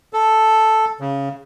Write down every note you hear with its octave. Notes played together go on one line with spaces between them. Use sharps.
A4
C#3